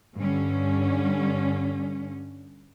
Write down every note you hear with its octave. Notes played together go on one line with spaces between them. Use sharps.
G2 D3 G3 C#4